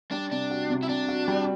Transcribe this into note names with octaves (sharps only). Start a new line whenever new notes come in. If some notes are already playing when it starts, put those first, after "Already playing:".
G3 D4
C3 D4
F#4
C3
E4
C3 D4
F#4
G3